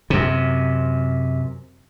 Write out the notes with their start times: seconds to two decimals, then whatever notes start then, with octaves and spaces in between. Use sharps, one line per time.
0.10 F#2 C3